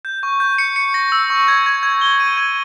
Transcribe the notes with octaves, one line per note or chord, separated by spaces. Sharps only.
G6
C#6
G6
C#7
C#7
A#6
E6
C#6
G#6
G#6
G#6
G7
D#7
G#6